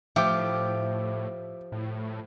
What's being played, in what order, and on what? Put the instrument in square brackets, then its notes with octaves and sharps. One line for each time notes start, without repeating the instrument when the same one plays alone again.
[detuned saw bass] A2 [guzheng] F3 G4 [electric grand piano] E5 D6
[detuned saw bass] A2